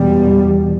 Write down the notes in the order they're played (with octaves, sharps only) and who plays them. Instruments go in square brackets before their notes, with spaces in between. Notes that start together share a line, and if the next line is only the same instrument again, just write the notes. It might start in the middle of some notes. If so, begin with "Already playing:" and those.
Already playing: [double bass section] E2 B2 G3